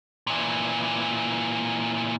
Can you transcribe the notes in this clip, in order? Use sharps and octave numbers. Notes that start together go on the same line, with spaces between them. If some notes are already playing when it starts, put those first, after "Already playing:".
A#2 E3